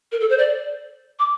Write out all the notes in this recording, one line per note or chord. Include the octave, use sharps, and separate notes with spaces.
A#4
A4
C5
D5
D6